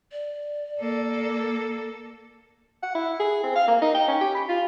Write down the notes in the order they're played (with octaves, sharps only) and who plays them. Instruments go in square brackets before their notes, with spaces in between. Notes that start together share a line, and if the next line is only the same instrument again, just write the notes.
[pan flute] D5
[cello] A#3 A4
[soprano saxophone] F#5
E4
G#4
C4
F5
A#3
D#4
G5
C#4
G4
B5
F4